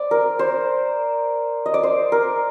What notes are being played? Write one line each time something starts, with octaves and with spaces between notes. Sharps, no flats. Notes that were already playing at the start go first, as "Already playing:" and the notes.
Already playing: C5 D5
A#4
C5
D#5
D5
C5
A#4